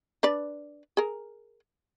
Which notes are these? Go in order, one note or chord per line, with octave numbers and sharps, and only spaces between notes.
D4 B4 D5
G#4 A#4